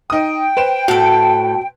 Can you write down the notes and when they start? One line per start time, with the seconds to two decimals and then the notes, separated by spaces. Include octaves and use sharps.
0.10 D#4 G5 D#6
0.57 B4 C5 E7
0.88 A2 F#4 A4